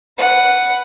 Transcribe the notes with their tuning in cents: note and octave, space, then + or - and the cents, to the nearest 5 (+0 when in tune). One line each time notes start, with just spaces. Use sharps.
B4 +0 F#5 +0